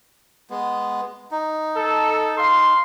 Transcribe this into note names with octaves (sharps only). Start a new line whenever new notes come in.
G#3 B3
D#4
A4
F5 C6